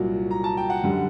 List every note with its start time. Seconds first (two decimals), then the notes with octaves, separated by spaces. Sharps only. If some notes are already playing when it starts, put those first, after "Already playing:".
Already playing: C2 A#2 F#3
0.31 A#5
0.44 A5
0.57 G5
0.70 F#5
0.84 F#2 D3 G3